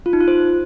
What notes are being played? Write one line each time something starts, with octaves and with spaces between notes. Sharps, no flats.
F4
D#4
F4
C5